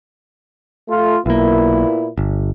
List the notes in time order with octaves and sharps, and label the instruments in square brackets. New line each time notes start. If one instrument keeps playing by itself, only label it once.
[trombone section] A3 F4
[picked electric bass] B1 A#3 [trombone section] A#2 B3 E4
[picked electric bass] G1